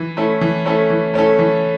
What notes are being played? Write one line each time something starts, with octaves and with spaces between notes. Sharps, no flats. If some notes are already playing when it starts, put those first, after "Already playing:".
Already playing: E3
A3 C#4 E4 A4
E3
A3 C#4 E4 A4
E3
A3 C#4 E4 A4
E3